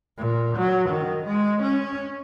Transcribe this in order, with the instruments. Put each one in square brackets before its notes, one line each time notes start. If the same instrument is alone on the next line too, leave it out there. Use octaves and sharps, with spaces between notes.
[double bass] A#2
F#3
D#3
G#3
C#4